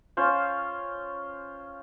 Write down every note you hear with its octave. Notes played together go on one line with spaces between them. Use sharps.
C#4 F4 C5